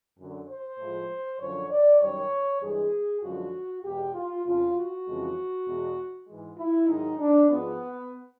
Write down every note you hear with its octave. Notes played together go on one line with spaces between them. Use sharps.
F#2 D3 F#3
C5
A2 F3 G#3
F#2 D3 F3 C#5
D5
F#2 D#3 G3 C#5
G2 E3 G#3 G#4
F#2 D3 F3 G#3 F#4
E2 B2 G#3 G4
F4
F2 C#3 F3 F4
F#4
F2 C#3 E3 G#3
E2 B2 G#3
G#2 E3 G#3
E4
G#2 D#3 F#3 D#4
D4
G#2 F3 G#3 B3